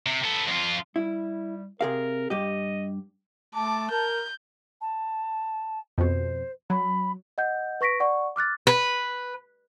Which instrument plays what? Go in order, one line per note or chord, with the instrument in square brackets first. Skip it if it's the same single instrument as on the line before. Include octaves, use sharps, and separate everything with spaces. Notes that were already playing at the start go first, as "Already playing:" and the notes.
[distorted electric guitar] C3
B3 A4
F2 F4
[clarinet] G3 [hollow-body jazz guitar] E4
[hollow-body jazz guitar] C3 G#4 F5 [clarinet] A#4
[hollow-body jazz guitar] G2 G4 [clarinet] D#5
[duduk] A3 [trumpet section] A5 [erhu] D6
[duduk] A#4 [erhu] G6
[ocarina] A5
[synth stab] F2 B2 [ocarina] C5
[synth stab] F#3 [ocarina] B5
[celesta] D#5 F#5 G6
B4 C#6 A#6 B6 D7
D5 F#5 C#6
D6 F6 F#6 A6
[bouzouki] B4